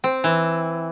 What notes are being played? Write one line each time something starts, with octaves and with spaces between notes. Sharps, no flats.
C4
E3